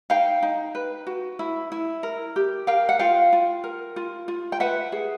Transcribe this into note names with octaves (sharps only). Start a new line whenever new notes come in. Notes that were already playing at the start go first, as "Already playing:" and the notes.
D#4 F5 G5
D#4
B4
F#4
E4
E4
A#4
G4
A#4 F5 G5
F#5
F4 F5 G5
F4
A#4
F4
F4
G5
B4 E5 F#5
G#4